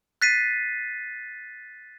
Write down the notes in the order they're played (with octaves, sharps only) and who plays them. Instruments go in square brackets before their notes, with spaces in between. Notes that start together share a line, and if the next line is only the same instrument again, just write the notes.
[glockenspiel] F#6 A6 B6 C7 D#7